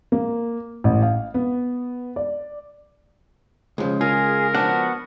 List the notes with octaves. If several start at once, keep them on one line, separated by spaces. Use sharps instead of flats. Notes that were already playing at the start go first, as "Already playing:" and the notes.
A#3
A1
F5
B3
D5
C#2 C#3 F3 G#3
F4 G#4 A#4
F3 B3 D4 F#4 F#5